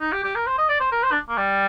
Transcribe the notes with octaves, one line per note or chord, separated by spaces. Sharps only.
D#4
G4
G4
A#4
C5
D#5
D5
C5
A#4
C5
D4
A#3
G3